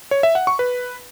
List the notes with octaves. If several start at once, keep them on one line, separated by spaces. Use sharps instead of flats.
C#5
E5
F#5
C#6
B4